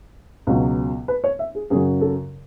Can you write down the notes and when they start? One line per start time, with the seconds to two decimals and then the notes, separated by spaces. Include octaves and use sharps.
0.47 C#2 B2 F#3
1.08 B4
1.24 C#5
1.39 E5
1.55 G#4
1.70 F#2 C#3 F#3 G#4
2.01 A4